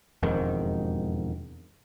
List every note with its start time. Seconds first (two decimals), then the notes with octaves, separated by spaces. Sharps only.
0.23 E1 F2 G#2 D#3